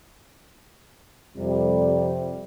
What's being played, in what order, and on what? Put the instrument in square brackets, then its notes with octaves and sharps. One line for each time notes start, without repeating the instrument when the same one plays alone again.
[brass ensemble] F2 C3 G3